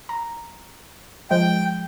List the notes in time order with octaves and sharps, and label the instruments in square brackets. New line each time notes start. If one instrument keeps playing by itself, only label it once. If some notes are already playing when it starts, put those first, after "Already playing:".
[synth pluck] A#5
[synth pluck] F3 G#3 [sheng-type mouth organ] G5